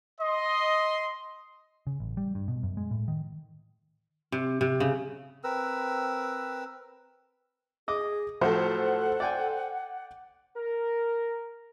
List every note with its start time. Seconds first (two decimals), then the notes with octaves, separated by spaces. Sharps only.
0.20 D#5 C6
1.87 C#3
2.00 A1
2.17 G3
2.35 G2
2.48 B2
2.63 F#2
2.77 G#3
2.91 A2
3.08 D#3
4.32 C3
4.61 C3
4.80 C#3
5.44 C4 A#4 B4 E6
7.88 G#4 D#5 D6
8.41 A2 F3 F#3 A4 C5 F#5
9.20 D5 G5 G#5
10.57 A#4